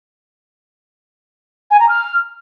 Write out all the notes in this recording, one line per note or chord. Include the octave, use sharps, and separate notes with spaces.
G#5
A#5
F6